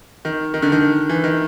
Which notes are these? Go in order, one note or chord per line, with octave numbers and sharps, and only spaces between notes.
D#3
D#3
D3
D#3
E3
D#3